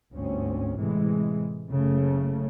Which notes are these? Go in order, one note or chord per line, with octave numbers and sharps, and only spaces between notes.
G1 D2 G#2 C4 C#4
A2 C3 E3 G#3
F#1 C#3 A3